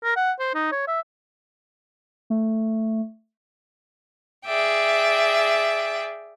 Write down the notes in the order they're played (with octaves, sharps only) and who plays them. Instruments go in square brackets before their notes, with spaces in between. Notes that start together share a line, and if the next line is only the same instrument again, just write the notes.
[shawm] A#4
F#5
C5
D#4
C#5
E5
[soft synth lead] A3
[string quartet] G#4 D5 E5 G5